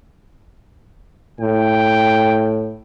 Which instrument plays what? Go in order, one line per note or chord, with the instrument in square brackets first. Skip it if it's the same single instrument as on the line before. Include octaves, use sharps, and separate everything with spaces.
[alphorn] A2 [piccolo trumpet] G5